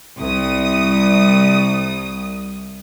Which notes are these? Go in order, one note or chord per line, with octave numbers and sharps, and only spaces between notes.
C2 D#6